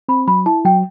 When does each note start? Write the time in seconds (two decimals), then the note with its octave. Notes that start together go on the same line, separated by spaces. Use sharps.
0.09 C4 B5
0.28 F#3 B5
0.46 E4 A5
0.65 F#3 G5